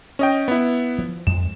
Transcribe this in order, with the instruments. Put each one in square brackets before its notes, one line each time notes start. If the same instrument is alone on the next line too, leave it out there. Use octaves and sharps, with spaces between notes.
[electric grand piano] C#4 D#5 G5
B3 E4
[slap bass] F3
[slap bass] F2 G#3 [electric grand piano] E7